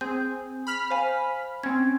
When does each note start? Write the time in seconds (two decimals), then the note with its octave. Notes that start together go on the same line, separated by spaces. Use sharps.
0.01 C4 G#4 G6
0.67 B5 F6 B6
0.90 C5 F5 G#5
1.63 C4 C#4 G#6